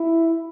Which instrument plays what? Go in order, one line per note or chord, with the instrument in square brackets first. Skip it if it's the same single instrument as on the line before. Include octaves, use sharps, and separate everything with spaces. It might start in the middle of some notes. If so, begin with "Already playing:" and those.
Already playing: [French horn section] E4